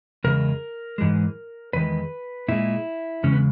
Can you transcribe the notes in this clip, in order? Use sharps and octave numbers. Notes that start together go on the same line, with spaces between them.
E2 C#3 G#3 A#4
G#2 E3 G#3
E2 D#3 G#3 B4
A#2 G#3 E4
E2 C#3 G#3 C#4
B3